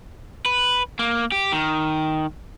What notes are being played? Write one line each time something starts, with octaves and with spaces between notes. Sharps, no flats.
B4
A#3
G4
D#3